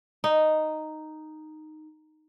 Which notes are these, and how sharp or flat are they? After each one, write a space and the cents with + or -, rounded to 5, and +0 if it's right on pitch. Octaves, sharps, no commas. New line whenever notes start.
D#4 -5